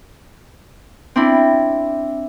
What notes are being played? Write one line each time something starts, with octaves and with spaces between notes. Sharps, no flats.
C4 D4 E4